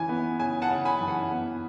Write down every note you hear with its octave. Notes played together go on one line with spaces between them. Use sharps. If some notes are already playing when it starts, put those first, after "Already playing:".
Already playing: C#3 E3 G#5
B3
C#3 G#5
F#5 A5
C#3
G#5 B5
E3
F#5
B3